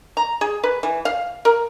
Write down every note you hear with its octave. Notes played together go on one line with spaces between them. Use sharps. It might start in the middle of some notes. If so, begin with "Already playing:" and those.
A#5
G#4
B4
E3
F5
A#4